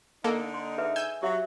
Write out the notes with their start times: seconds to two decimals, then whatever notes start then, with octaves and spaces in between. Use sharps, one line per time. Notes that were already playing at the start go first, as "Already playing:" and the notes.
0.24 D3 A#3 D#4 A4
0.54 C6
0.78 G#4 B4 E5
0.96 G#5 E6 G6
1.23 F#3 G4 E5